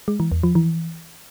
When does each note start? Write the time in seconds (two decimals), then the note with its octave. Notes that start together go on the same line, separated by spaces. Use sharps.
0.08 G#3
0.20 E3
0.32 E2
0.43 F3
0.55 E3